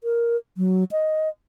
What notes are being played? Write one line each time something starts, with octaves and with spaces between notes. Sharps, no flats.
A#4
F#3
D#5